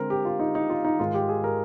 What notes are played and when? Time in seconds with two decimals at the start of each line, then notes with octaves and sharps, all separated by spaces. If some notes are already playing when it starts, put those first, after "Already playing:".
Already playing: D3 G#3 C4 A#4
0.10 G4
0.25 F4
0.40 D#4
0.55 D#4
0.69 F4
0.85 D#4
1.00 G#2 D#3 G#3 F4
1.14 G4
1.29 G#4
1.44 A#4